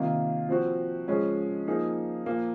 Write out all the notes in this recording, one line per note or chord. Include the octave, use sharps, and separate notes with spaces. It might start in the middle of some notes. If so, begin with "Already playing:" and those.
Already playing: C3 D#3 A#3 F4
F3 C4 F#4
C#3 F3 G#3 C#4
F3 A#3 D#4 G#4
A#2 F3 A#3